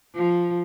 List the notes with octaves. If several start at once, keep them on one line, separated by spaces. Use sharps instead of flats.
F3